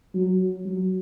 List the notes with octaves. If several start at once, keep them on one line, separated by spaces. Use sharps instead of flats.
F#3
F#3